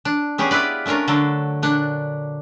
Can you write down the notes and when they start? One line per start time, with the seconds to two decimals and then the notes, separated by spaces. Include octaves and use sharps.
0.05 D4
0.38 B3 C#4 G4 G#4
0.51 E4 F4 B4 D5
0.86 A3 C#4 D4 F4 A#4
1.08 D3 F#3 A4
1.62 A#2 D4 F#5